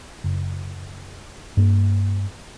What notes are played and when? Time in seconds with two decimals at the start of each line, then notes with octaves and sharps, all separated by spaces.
0.24 F#1
1.57 G2 A#3